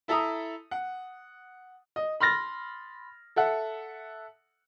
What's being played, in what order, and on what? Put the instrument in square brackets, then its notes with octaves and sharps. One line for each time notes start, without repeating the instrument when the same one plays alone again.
[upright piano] E4 A4 E5 A#5 D#6
F#5
D#5
B5 C6 F6 A6 A#6
A4 E5 F#5